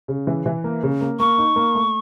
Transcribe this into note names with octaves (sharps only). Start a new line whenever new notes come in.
C#3
E3
E3
A#3
C#3
A#3
A#3 C#6
D#4
A#3
A3